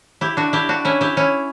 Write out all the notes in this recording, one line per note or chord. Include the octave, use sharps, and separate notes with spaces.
E4 G4
D4 F#4
E4 G4
D4 F#4
C#4 E4
E4 G4
C#4 E4